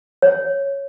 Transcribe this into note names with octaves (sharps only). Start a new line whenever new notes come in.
C#5